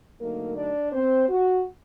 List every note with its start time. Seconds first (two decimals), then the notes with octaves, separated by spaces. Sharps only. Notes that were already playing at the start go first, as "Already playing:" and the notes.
0.20 D3 F#3 A3 A#3 D#4 A#4
0.56 D4 D5
0.92 C4 C5
1.29 F#4